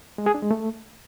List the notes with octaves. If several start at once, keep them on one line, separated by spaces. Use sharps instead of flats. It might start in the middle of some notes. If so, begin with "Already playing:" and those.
G#3
G#4
D4
G#3
A3